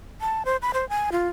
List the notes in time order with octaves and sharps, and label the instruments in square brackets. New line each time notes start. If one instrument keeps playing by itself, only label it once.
[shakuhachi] A5
C5
B5
C5
G#5
F4